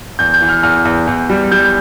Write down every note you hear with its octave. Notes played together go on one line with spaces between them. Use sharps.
E2 G6
G6
E3
F6
E2 F6
E2
E2
G3
G3 G6